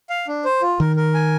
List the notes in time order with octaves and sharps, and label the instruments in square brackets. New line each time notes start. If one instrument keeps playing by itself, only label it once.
[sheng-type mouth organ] F5
D4
C5
F4
[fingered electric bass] D#3 [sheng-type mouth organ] A#4
[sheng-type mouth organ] A#4
G#5